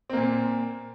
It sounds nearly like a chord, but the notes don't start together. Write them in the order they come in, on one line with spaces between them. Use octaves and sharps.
C4 A#3 A#2